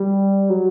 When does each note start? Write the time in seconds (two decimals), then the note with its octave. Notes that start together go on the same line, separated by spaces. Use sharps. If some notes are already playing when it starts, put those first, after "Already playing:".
Already playing: G3
0.50 F#3